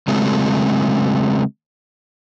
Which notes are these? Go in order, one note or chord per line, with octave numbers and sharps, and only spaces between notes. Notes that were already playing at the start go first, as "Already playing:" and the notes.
C#3 F#3 G#3 A3 C4